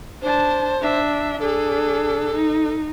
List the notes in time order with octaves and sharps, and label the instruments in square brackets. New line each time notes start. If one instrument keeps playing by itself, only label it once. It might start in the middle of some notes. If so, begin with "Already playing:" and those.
[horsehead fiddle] D4 A5 [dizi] C5
[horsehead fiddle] D4 E5
[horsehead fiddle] D4 G#4 [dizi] A4
[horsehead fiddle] D#4